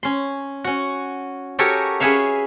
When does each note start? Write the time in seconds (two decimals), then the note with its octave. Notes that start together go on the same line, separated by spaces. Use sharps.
0.03 C#4 C6
0.64 C#4 F#4
1.59 F#4 G4 A4 A#4 C#5 G#5
2.00 C#4 G#4 B4 C#5 E5 F5